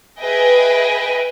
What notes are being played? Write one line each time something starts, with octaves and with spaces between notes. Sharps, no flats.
G#4 B4 D#5 E5 G5 G#5